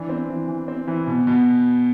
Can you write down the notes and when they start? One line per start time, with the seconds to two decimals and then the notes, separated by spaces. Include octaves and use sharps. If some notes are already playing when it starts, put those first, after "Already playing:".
Already playing: E3 D4
0.09 C4
0.29 E3
0.48 E3
0.68 C4
0.88 E3
1.07 B2
1.27 B2